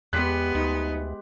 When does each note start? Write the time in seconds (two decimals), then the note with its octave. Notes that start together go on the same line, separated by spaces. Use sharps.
0.13 E2 G#3 B3 G4 F#6 B6
0.55 D2 D#4